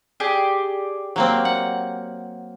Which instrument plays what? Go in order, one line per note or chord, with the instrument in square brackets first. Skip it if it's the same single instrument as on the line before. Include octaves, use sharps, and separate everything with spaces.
[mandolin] G4 G#4 D5
[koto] F#3 A#3 C4
F#5